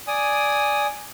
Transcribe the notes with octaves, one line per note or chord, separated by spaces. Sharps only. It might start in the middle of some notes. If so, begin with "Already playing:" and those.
D5 G#5 D#6